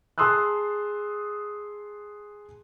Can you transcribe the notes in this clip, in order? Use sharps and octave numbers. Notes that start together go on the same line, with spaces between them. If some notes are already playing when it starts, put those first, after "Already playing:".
G#4 A5 C6 D#6 E6 F#6